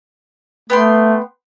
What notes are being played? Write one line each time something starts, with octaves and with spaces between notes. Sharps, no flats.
A3 B3 G5 C6